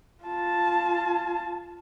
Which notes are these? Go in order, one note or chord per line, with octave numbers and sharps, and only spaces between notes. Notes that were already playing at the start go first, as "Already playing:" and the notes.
F4 A5